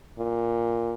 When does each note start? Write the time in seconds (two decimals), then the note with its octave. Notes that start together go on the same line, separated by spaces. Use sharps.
0.19 A#2